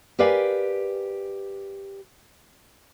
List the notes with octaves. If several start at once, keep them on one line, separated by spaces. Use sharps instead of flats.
G4 A#4 B4 D5 F5 G#5